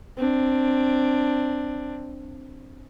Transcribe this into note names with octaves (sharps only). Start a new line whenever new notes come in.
C4 D4